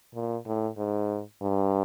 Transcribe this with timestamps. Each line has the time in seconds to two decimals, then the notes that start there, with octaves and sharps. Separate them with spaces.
0.15 A#2
0.46 A2
0.77 G#2
1.41 G2